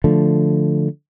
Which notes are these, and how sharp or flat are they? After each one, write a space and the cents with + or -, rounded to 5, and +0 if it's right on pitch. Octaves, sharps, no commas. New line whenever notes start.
D3 +0 F3 +0 A3 +0